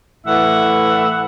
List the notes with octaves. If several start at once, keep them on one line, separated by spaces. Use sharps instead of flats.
A2 E3 E5 F#5